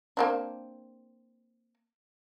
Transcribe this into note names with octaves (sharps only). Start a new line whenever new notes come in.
A#3 C4 D4